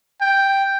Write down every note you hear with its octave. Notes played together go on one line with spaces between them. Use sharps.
G5